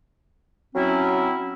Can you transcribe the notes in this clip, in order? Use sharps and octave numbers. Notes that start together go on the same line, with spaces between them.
F#3 C4 C#4 E4